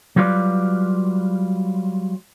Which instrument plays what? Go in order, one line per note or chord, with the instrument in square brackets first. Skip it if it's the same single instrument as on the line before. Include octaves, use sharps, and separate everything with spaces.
[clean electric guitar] F#3 G3 F4 B4 D5